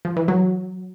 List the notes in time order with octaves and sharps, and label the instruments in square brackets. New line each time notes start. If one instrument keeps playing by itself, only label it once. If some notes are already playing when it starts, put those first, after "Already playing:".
[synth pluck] F3
E3
F#3